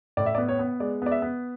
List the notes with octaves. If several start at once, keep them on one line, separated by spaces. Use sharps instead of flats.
A2 D5
E5
D5
B3
C#5
B3
G#3 D5
B3 D5
E5
B3